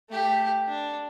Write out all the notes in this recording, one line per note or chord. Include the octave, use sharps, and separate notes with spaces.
A3 G4
D4